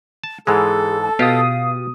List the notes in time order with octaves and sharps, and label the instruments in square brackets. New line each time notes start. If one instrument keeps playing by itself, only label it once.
[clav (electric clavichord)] A5
[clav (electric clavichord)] G#2 E3 G#3 [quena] G#4 [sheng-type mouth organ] A4
[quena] A5
[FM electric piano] B2 D#6 [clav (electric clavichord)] F4 G4 [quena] F5